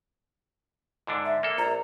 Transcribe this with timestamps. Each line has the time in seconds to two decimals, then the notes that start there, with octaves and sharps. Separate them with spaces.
1.07 G#2 D3 D4
1.25 E5
1.43 A#3 A4
1.58 A#1 A#5